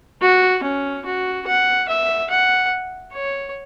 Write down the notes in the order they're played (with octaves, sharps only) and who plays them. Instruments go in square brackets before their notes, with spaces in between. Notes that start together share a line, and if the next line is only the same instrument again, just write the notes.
[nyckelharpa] F#4
C#4
F#4
F#5
E5
F#5
C#5